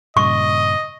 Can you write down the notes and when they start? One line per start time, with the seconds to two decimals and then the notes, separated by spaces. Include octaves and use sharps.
0.17 G2 A#2 C#3 D#5 C#6